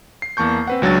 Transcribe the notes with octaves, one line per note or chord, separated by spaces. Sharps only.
C7
E2 A#3 A5 C#6 G6
C4 B4 F#5
C#2 F#3 D4 A6